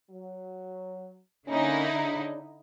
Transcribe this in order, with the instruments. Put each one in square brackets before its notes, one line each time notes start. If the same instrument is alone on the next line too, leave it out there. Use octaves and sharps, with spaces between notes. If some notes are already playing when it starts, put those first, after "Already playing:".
[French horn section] F#3
[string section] D3 D#4 E4 [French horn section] A#3 C#4
[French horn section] C#3 D4